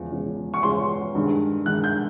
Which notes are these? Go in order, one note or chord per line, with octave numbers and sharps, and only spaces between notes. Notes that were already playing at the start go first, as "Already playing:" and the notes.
Already playing: E2 C#3 F3 G#3 C#4
E2 C#3 F3 G#3 C#4
C#6
E2 C#3 F3 G#3 C#4 C6
G2 D#3 G#3
G2 D#3 G#3 F#6
G6